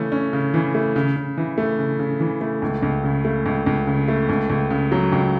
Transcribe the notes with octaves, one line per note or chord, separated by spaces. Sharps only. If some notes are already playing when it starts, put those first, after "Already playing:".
Already playing: C#3 E3 A3 C#4
C#4
C#3
E3
A3
C#3
C#3
E3
A3
C#3
C#3
E3
A3
C#2
C#2
C#3
A3
C#2
C#2
C#3
A3
C#2
C#2
C#3
F#3
C#2